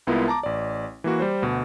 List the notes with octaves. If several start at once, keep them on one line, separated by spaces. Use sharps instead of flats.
C2 G#3 B3 E4 F4 A#4
A5 A#5 D6
A1 D5
E3 A#3 F#4
G3 C5
D2 B2